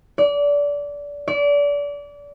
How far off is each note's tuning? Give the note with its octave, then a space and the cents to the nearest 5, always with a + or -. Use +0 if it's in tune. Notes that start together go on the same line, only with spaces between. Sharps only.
D5 -25
D5 -30